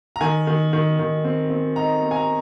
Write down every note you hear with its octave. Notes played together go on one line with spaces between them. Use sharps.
A#5
D#3 G#5
D#3
D#3
D#3
C4
C4
D#4 A#5
C4
G#5
A#5